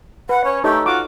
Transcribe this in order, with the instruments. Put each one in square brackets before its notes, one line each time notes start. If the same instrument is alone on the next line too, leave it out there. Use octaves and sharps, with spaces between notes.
[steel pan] B4 [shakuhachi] F#5
[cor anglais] C#4 [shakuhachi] C#5
[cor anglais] A3 [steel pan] D#4 A4 C#5 [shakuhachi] G4
[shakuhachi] F4 [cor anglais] F#4 [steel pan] D6